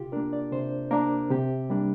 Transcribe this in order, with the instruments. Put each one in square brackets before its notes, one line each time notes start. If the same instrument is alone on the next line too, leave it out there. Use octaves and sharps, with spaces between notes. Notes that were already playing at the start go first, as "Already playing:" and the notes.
Already playing: [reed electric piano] C3 F4 G4
A#3 D4 A#4
D5
C3 C5
A#3 D4 A#4
C3 G4
G3 A#3 D4